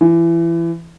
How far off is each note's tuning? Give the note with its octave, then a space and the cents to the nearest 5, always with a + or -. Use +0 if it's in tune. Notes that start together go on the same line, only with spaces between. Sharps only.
E3 +25